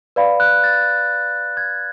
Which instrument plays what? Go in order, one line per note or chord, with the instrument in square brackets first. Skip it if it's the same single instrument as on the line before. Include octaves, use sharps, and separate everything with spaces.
[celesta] B4 D5 F5 B5
[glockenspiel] F#6
A6
G#6